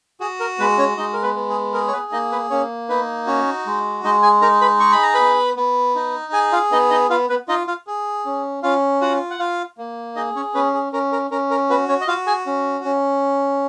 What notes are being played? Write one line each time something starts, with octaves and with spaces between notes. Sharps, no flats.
F#4 G#4
A#4
G#3 B3 B4
C#4 C#5
G#3 D#4 D#5
A#4
B3 B4
B3
G#4
G#4 A#4
C#5
B3 B4
A#3 D#4 D#5
B3 B4
A#3 C#4 C#5
B3 D#4 B4
C#4 F#4 C#5
G#3
G#3 D#4 D#5
G#4 G#5
D#4 A#4 A#5
B4 B5
G#4 C#6
B5
A#5
B3 B4 B5
B3
D#4
G#4 G#5
F4 F5
B3 D#4 D#5
D#4 D#5
B3 F4 F5
B3 B4
D#4 F4 D#5
F4 F5
G#4
C#4
C#4 F4 F5
F4 F#4 F#5
F#5
F4 F5
A#3
D#4 G#4 D#5
C#4 C#5
B3 C#4 B4
G#4
C#4 A#4
A#4
C#4 A#4
A#4
B3 F#4 B4
C#4 C#5
D#5
F4 F#4 F5
G#4 G#5
C#4
C#4